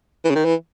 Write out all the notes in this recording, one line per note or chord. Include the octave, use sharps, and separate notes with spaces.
E3
C#3
D#3
E3